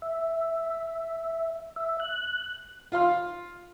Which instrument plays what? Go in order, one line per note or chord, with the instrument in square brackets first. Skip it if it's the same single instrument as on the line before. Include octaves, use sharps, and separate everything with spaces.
[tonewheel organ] E5
E5
F#6
[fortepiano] F4 F5 C6 F6